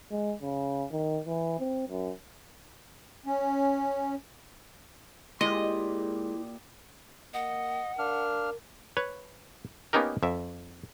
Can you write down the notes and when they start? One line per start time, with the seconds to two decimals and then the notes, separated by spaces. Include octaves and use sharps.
0.11 G#3
0.41 C#3
0.91 D#3
1.26 E3
1.59 C4
1.89 F#2
3.26 C#4
5.41 A#2 G#3 E4 G4 D#5 C6
7.34 A#3 D#5 F#5
7.99 D4 A#4 F5 F6
8.97 B4 C#5
9.93 A#3 B3 C#4 D#4 G4 A#4
10.23 F2 E5